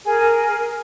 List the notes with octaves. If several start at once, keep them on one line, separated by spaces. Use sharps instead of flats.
G#4 A#4 G#5